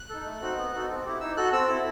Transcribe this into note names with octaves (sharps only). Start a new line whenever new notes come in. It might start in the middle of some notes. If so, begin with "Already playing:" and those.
Already playing: F#6
D#4 A4
A3
C4 D#4 F#4
B3
D#4 F#4 A4
C4
E4 G4
D#4 E6
F#4 A4 F#6
C4 E6
E4 A4